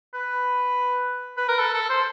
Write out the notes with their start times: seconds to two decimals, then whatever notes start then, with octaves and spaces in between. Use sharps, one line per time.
0.14 B4
1.38 B4
1.48 A#4
1.59 A4
1.74 A4
1.90 C5